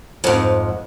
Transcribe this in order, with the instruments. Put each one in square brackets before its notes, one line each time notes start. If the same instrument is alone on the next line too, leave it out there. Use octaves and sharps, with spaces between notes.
[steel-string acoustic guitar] F2 G#2